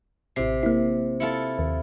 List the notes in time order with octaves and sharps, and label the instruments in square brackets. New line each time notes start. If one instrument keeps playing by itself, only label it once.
[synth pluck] A1 C7 [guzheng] C3
[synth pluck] A#3 E4
[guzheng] E4 F4 A4 [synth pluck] C#7
[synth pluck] D#2